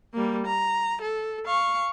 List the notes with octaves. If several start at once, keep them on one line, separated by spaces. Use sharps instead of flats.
G3 A#3
A#5
A4
F5 C#6